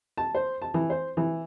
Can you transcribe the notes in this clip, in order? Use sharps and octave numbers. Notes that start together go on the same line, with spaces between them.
A5
C5
A5
E3
C5
E3